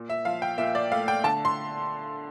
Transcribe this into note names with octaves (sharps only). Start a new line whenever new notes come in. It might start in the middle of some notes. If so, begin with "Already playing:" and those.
Already playing: A#2
E5
F3 F5
G5
A#2 E5
D5
A3 F5
G5
D3 A5
C6